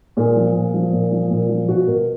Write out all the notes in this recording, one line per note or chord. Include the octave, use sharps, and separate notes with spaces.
A#2 G#4
F3
A#2
F3
A#2
F3
A#2
F3
B2 F#4
B2 A#4